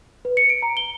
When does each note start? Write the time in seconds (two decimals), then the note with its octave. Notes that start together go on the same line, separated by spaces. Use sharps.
0.25 B4
0.37 C#7
0.50 D7
0.62 A#5
0.77 G7